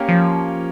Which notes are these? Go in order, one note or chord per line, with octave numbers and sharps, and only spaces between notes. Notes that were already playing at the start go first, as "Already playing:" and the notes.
Already playing: A#3 C#4 G4 C#5 F5
F3